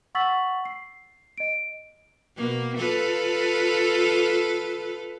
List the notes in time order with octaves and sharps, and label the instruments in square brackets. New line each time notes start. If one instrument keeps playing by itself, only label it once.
[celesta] F#5 C#6 E6 A6 B6 F#7
C7
D#5 D7
[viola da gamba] B2 A#3
F4 A4 B4